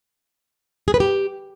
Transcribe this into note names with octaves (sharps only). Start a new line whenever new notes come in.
G#4
B4
G4